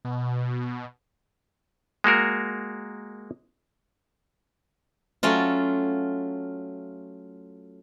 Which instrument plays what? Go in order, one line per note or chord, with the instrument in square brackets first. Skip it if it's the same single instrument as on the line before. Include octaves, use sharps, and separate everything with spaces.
[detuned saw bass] B2
[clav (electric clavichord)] G#3 A#3 F#4 A#4
[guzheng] F#3 A3 C#4 F4